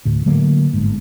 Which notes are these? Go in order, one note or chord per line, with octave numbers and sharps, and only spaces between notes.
D2 A2
D3 F#3 A3 A#3
G1 G#2